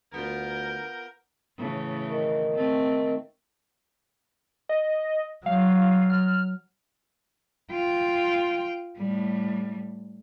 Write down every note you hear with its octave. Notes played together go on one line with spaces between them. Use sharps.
D2 B3 F4 A#4 G6
A2 C#3 E3
D#3
A3 C4
D#5
F#3 F5
F6
F4 G5
A2 G3